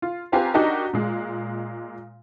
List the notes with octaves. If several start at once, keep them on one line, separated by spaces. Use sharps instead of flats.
F4
C4 F4 G4 B4 G#5 A#5
D4 D#4 F#4 G4 A#4 D#5
A#2 G#3